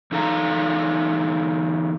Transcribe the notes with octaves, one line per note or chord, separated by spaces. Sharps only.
E2 D#4 A4 F5 A#5